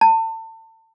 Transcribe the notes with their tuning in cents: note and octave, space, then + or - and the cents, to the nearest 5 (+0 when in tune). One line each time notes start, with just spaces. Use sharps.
A5 +35